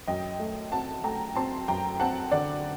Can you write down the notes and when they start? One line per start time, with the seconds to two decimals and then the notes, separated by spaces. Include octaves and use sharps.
0.07 F#2 D#5 G5
0.40 A3
0.72 C4 F#5 A5
1.04 A3 G5 A#5
1.36 C4 A5 C6
1.68 F#2 G5 A#5
2.00 C4 F#5 A5
2.31 D3 D5 F#5